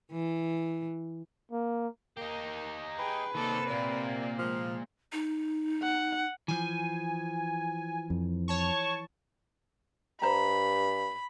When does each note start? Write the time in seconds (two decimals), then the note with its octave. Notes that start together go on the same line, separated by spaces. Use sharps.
0.12 E3
1.52 A#3
2.17 A#3 D#4 G4
2.99 G#4 B4 G5
3.34 C3 D#3 A#3 C4 A4 D5
3.70 A#2 D5
4.39 F3 G#3
5.13 D#4
5.83 F#5
6.48 E3 F3 G#5
8.10 F2
8.48 C#5 A5 C#6
10.22 G2 C5 A#5 B5